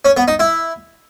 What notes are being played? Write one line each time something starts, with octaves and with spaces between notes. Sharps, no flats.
C#4
B3
D#4
E4